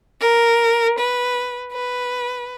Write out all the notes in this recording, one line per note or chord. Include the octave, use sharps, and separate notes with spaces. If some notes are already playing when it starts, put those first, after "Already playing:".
A#4
B4
B4